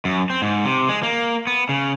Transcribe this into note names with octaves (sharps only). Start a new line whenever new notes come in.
F#2
C4
G#2
C3
G#3
A#3
B3
C#3